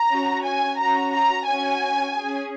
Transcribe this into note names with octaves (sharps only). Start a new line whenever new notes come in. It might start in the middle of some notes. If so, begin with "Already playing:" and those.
Already playing: A#5
C#4 F#4
G#5
C#4 F#4 A#5
A#5
C#4 F#4 G#5
C#4 G#4